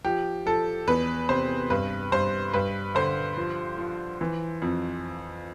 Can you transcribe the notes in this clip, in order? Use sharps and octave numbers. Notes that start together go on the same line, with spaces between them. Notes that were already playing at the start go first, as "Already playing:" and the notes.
F3 G4
F3 A4
E2 B4
C3 C5
G2 B4
G2 C5
G2 B4
D3 C5
F3
F3
E3
F2